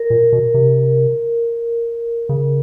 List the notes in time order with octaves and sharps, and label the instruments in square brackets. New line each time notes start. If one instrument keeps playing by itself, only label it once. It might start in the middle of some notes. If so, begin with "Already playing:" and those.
Already playing: [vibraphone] A#4
[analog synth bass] A#2
B2
C3
C#3